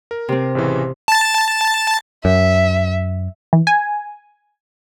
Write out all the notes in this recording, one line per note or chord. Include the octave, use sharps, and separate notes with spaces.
A#4
C3 C4
A1 C#3 E3
A5 A6
F#2 E5
E3
G#5